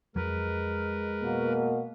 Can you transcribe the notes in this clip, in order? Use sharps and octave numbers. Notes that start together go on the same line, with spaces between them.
F2 F#3 G#3 A#4 B4
B2 A#3